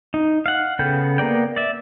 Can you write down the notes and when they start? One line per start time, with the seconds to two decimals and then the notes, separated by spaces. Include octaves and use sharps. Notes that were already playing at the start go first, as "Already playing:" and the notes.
0.14 D#4
0.46 F5 F#5
0.79 C#3 B3 A4 G5 G6
1.18 A#3 B3 A#4 D5 G5
1.56 D5 E5